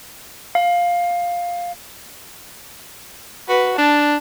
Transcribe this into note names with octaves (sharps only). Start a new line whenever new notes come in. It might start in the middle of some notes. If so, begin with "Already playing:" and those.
F5
F#4 B4
D4 A5